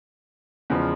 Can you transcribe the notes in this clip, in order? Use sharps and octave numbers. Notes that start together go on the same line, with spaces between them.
E2 C#3 F3 G#3